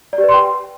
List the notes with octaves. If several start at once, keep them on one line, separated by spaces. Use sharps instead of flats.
D5
G4
B4
C6
G5